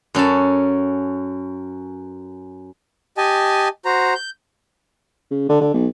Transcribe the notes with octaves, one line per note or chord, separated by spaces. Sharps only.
F#2 C#4 A4 A5
G4 D#5 G#5 A5
F#4 C5 A#5
G6
C#3
D3
D3
B1